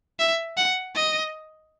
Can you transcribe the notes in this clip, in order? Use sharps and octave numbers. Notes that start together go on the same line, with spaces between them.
E5
F#5
D#5